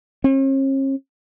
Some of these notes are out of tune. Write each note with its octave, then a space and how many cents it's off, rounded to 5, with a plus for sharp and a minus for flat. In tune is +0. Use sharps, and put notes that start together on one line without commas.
C#4 -45